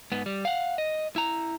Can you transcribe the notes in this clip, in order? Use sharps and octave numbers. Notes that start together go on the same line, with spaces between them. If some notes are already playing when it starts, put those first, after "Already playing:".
G#2 B3
G3
F5 F#5
D#5
E4 A#5